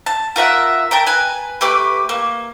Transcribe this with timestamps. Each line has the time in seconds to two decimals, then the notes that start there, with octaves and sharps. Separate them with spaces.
0.06 A5
0.36 F4 A#4 E5 F#5
0.91 A#4 G5 A5
1.06 B4 G#5
1.61 A3 G4 B4 D6
2.09 A#3